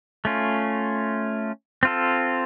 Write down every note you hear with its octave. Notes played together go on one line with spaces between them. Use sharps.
A3 C#4 F4
C4 F4 A4